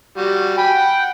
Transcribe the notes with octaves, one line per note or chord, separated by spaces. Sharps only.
G3 F#4
G5 G#5 B5
F#5